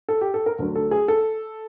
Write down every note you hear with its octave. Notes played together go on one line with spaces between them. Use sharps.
A4
G4
A4
A#4
D2 D3 F#3
A4
G#4
A4